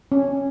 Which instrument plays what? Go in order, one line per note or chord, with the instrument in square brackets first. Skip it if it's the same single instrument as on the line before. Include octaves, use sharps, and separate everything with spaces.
[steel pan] C#4